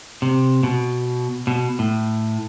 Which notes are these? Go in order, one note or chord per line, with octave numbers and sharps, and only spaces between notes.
C3
B2
B2
A2